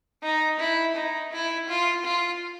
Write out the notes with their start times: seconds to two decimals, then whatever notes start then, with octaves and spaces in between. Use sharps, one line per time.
0.23 D#4
0.59 E4
0.96 D#4
1.32 E4
1.69 F4
2.05 F4